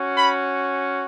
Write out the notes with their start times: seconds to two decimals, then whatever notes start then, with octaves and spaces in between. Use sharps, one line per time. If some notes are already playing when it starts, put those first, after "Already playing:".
Already playing: C#4 F#4
0.18 B5